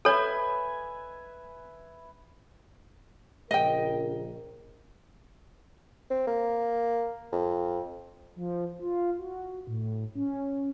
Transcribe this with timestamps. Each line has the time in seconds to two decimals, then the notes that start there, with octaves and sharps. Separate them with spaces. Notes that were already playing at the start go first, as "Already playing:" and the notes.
0.05 A4 B4 C#5 E5 G#5
3.51 A#1 C#3 A#4 D#5 G5
6.10 C4
6.27 A#3
7.32 F2
8.36 F3
8.79 F4
9.19 F#4
9.67 A2
10.15 C#4